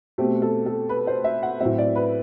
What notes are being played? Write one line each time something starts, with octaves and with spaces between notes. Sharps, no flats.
B2 A3 C4 G4
A4
A4
B4
C5
E5
F#5
A2 F#3 C4 E5
D5
B4